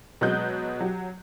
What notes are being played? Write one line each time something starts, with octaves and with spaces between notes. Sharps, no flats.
B2 F#3 G#3 D#6 F#6 G6
F#3 G4